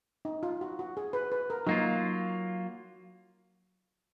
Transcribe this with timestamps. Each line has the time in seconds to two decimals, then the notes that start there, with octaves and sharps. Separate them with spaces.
0.25 D#4
0.43 F4
0.61 F#4
0.79 F#4
0.97 G#4
1.13 B4
1.32 B4
1.50 A#4
1.67 F#3 A#3 D#4 F4